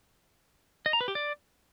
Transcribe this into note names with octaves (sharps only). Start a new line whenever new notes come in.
D#5
A#5
B4
G4
D5